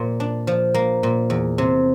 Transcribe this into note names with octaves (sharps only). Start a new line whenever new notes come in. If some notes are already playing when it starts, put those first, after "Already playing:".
Already playing: A#2 F3 A#3
D4
F3
A#3
A#2
E2
C3